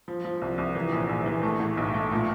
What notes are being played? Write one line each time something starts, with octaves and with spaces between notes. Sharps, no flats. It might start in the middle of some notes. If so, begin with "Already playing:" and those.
F3
F3
C2
C2
E3
A#1
A#1
E3
A3
A2
B1
A3
A#2